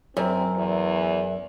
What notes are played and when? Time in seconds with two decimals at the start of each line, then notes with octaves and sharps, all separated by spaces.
0.17 F#2 C4
0.57 E2